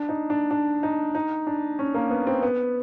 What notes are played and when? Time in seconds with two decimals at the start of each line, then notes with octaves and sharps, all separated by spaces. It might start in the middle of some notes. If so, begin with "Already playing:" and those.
Already playing: D4
0.09 D#4
0.30 D4
0.51 D4
0.83 D#4
1.15 D#4
1.47 D4
1.79 C#4
1.94 A#3
2.10 B3
2.27 C4
2.42 B3